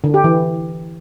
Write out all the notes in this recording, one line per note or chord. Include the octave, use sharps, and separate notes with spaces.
D3
G4
E3